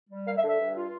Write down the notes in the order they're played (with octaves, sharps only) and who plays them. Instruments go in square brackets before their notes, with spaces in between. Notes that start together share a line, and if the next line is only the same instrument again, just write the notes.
[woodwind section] G3
A#3 F5
E5
D3
E5
G2
F4